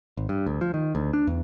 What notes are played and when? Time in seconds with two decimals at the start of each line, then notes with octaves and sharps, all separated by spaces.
0.17 G#1
0.29 G2
0.46 D2
0.61 F3
0.74 D#3
0.95 D2
1.13 D4
1.27 E2